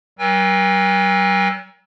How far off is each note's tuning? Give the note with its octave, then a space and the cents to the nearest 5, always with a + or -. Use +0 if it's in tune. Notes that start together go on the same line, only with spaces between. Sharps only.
F#3 +45 A#4 +45 G#5 -45